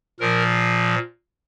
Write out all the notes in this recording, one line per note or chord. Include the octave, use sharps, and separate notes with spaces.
A#2 F3 A#4